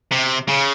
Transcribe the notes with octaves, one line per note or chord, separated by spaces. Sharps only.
C3
C#3